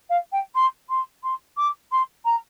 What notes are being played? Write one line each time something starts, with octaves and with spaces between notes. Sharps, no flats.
F5
G5
C6
C6
C6
D6
C6
A#5